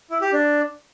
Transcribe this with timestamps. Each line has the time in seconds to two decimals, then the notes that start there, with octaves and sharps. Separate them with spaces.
0.10 E4
0.21 G4
0.33 D4